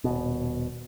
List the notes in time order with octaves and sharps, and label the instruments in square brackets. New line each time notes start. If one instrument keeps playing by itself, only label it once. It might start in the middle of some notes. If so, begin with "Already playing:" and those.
[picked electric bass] D#1 G#1 B2